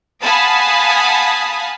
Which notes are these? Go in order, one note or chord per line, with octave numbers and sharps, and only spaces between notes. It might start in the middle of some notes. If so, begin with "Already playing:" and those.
F5 F#5 G#5 A5 B5 D#6